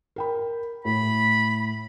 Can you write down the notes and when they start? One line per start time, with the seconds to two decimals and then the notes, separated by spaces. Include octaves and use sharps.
0.16 A#4 G5 B5
0.85 A2 B5